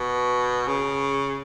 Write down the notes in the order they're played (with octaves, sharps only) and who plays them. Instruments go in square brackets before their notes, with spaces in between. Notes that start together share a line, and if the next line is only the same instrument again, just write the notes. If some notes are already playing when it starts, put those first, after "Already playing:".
Already playing: [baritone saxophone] B2
C#3